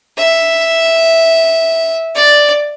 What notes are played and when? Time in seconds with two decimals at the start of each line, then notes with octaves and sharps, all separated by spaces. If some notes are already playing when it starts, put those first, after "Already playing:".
0.18 E5
2.15 D5